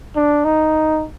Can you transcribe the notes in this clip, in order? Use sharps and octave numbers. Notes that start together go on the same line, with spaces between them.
D4
D#4